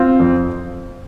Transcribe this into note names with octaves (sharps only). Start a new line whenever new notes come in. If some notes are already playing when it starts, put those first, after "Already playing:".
Already playing: C4 F4
F2 F3